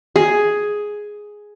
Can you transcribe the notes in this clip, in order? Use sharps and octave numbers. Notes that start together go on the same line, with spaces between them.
G#4